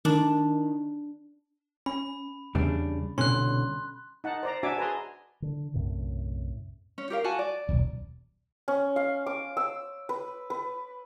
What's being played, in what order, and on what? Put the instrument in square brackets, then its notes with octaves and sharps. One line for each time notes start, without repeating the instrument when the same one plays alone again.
[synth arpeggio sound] D#3 [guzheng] D4
[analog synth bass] C#4 [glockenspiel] B5
[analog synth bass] E2 [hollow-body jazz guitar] C#3 G3 D4
[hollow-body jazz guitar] C2 B2 D3 [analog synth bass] C#4 [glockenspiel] C6 F#6
[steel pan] D#4 F#5 A5
C5 D5 A#5
D4 F#4 D5 E5 G#5 D6
G#4 B4 G#5 A#5 C6
[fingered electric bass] D3
B1 F#2 A2 C3
[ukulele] C#4
G4 A#4 F5
F#4 G#5 A5
D5
[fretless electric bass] D#1 B1
[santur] C#4
F5
D6
E6
B4
B4